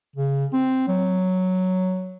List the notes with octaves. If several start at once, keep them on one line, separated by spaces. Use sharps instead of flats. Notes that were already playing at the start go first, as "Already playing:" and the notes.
C#3
C4
F#3